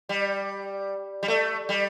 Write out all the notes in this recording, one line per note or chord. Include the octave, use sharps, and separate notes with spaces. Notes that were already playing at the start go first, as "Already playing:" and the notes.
G3
G3
A3
G3